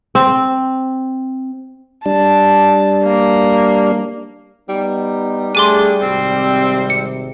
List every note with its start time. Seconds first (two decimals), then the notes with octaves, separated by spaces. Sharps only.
0.15 C4
2.06 G3 D4 A5
3.03 A#3
4.69 G3 B3 D#4
5.55 A3 D4 G#4 C6 D6 D#7
6.02 G#1 C3 C4
6.90 C#7